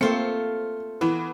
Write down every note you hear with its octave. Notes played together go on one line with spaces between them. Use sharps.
A3 A#3 C4 F4 C5 C#7
E3 B3